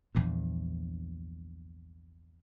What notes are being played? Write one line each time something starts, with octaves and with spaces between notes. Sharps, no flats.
A#1 E2 G2 A#2